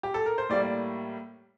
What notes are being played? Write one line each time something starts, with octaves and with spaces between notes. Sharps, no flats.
G4
A4
A#4
C5
A2 G3 A#3 D5
D5